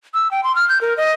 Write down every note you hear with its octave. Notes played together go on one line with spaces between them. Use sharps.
E6
G5
C6
F6
G6
A#4
D#5